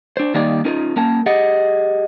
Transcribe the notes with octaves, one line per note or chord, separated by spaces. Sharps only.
D4 C5
D#3 G3 A#3 D#4 G4 D5
C#4 D#4 F4 A#4
A#3 C#4 A#4 G5 A5
G4 G#4 D#5 F#5